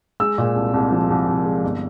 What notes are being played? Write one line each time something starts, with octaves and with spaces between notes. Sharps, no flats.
G#3 E6
A#2
C2
C2
F3
C2
C2
G#3
G1